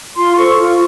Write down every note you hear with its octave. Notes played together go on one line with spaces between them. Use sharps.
F4 C6
A4 C5 C#6
F4